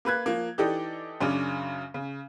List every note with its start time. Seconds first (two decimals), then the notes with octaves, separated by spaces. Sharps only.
0.05 A#3 B4 F#6 G#6
0.26 F3 A#3
0.58 E3 D#4 G4 A4 D5 D#5
1.21 F#2 C#3 C#4 D4
1.94 C#3